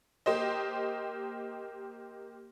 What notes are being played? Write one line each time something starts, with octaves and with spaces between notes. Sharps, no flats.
A#3 G4 C5 D#5